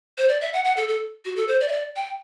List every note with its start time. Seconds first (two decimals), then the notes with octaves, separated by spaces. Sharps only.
0.18 C5
0.29 D5
0.41 E5
0.53 F#5
0.65 F#5
0.77 A4
0.88 A4
1.25 F#4
1.36 A4
1.48 C5
1.61 D5
1.68 E5
1.72 D5
1.96 G5